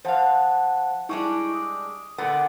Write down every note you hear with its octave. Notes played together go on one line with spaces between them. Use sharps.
F3 C5 F5 F#5 A5
G3 G#3 D4 E4 C#6
D#6
A#2 D3 B3